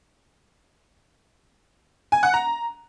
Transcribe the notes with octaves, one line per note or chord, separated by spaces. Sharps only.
G#5
F#5
A#5